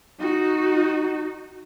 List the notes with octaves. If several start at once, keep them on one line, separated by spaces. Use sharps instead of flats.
D#4 F#4